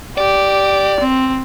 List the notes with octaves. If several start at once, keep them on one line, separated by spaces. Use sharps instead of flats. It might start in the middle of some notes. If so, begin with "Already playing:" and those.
G4 D5
C4